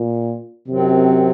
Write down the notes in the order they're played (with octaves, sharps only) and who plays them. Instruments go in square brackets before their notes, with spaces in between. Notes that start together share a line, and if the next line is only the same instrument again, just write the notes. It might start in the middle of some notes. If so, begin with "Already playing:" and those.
Already playing: [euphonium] A#2
[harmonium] F#2 D#3 F#3 C4 [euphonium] C3